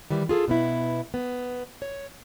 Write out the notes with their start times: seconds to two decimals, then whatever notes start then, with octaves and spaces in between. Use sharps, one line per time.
0.10 D#3 E3 G3
0.29 F4 G#4 A4
0.48 B2 B3 E4
1.14 B3
1.82 C#5